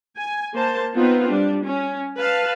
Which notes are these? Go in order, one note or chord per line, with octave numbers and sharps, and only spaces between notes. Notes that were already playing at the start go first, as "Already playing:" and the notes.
G#5
A#3 C5 A5
B3 C4 D#4 F4 B4
G3 D4
C#4
B4 F5 A5